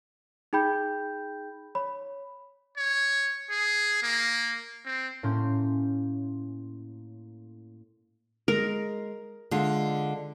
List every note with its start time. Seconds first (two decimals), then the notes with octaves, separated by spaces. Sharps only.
0.53 D#4 G#4 G5 B5 G6
1.75 C#5 B5
2.77 C#5
3.50 G#4
4.03 A#3
4.85 C4
5.23 A2 A#3 C#4 C6 G6
8.48 G#3 A#4
9.51 D3 G#3 F4